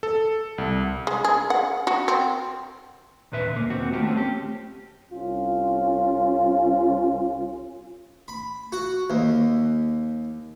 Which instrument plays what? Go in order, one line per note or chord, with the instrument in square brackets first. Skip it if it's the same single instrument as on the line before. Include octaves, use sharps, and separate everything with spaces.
[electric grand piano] A4
C2
[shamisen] G#3
G#4
F#5
F#4
C4
[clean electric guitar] D#2 A#2 B4 E5
D2 A#3
D#2 C4 F#4
D#3 A3 A#3 F4 G4
A3 C4 C#4
G4
[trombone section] C2 C#4 F4
[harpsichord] B5
F#4
D#2